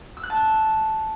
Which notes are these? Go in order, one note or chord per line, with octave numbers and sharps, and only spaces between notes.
E6
F#6
A5